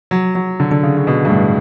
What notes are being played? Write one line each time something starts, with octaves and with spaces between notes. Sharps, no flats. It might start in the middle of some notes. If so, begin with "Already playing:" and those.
F#3
F#3
D3
D3
C#3
C#3
B2
G2
A2